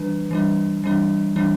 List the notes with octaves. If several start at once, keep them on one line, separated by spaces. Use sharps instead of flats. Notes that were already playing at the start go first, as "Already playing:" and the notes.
Already playing: E3 G3 D4 B4
E3 G3 D4
E3 G3 D4
E3 G3 D4